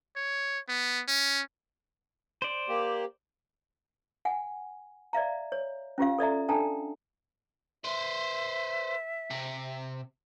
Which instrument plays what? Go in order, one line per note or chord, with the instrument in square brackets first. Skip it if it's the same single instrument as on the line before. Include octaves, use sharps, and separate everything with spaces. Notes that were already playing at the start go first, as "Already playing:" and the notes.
[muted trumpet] C#5
B3
C#4
[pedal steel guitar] C5 D5
[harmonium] A#3 G4
[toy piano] F#5 G#5
D5 E5 F5 A#5
C#5
C#4 F4 G4 F5
A4 D5 E5 A#5
D4 A4 G5 A5 A#5
[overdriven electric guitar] B4 C5 [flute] E5
[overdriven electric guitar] C3